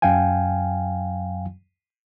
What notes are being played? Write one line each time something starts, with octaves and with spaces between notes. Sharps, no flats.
F#2 F#3 F5 G5 G#5